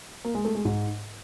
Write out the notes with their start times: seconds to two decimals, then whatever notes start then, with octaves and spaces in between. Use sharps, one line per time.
0.25 A#3
0.35 G#3
0.45 A3
0.55 G#3
0.65 G#2